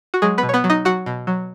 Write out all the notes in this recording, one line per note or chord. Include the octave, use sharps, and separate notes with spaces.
F#4
F#3 G#3 G#4
B3 B4
B2
C#5
B3 B4
F#3
D#4 D#5
F#3 F#4 F#5
B2
F#3